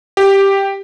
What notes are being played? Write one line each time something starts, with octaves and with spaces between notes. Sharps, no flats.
G4